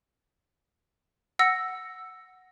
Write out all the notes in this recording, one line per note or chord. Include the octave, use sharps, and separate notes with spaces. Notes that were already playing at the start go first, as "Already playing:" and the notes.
F#5 E6 A#6 C#7